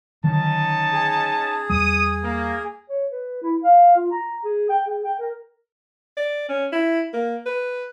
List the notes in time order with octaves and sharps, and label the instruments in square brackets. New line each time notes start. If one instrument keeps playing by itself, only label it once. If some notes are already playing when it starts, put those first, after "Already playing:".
[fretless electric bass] D3 D#3 F#3 [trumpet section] C#4 D#4 A5
[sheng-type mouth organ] G#4
[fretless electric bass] E2 G3 [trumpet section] D#6
[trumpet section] A#3
[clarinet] C#5
B4
E4
F5
F4
A#5
G#4
G5
G#4
G5
A#4
[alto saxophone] D5
C#4
E4
A#3
B4